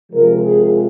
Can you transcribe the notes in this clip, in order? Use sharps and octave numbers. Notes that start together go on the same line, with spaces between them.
C3 F3 G#3 A#4
G#4